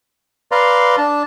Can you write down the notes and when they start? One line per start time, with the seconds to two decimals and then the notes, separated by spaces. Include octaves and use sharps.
0.52 B4 D5 F5 A#5 C6
0.98 D4 A5